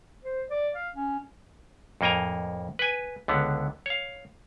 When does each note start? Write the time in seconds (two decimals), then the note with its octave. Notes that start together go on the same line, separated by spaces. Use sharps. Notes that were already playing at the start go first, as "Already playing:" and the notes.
0.25 C5
0.51 D5
0.75 F5
0.95 C#4
2.01 F2 A2 A#3 G5 G#5 A#5
2.79 B4 G#5
3.28 C#2 D3 B3
3.86 C#5 F5